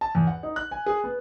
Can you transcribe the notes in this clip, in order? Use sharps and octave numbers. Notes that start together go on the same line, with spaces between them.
A5
E2
F#5
D#4
F#6
G#5
G#4
B3